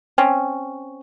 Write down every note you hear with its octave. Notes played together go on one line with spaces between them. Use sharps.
C4 C#4